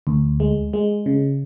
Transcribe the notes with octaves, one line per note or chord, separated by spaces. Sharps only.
D2
G#3
G#3
C#3